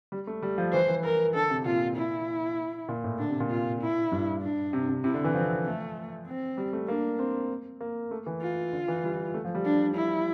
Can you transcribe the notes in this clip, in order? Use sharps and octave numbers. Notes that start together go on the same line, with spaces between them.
G3
A3
G3
F3
E3 C5
E3
A#4
D3 A4
C3
A#2 F4
E4
A#2
A2
D3 D4
C3
A#2
F4
E4
G2
D4
C3
C3
C3 E4
D3
E3
F3 C4
A3
C4
G3
A3
A#3 D4
C4
A#3
A3
E3
F4
D3
E3
G3
A3
F3
G3
D4
E4